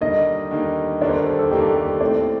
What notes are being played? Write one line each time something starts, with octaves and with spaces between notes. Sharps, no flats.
D#2 D3 G3 A#3 D#4 D#5
D#2 D3 G3 A#3 D#4
D#2 D3 G3 A#3 D#4 D5
C5
A#4
A4
A4
D#2 D3 G3 A#3 D#4 G4
A4
A2 A3 C4 D5